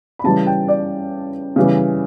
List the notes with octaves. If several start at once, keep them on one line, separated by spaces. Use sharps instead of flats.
B5
C#3 E3 G3 A5
G5
D5
C#3 E3 G3